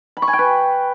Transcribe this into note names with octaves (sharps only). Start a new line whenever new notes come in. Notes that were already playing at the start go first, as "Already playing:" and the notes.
B5
C#6
G#5
G5
B4